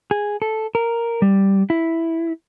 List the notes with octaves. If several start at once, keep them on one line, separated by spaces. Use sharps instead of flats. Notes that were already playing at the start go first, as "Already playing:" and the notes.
G#4
A4
A#4
G3
E4